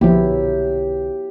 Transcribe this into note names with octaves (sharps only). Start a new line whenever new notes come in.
B1 A#2 D3 F3 F#3 B3 E4 G4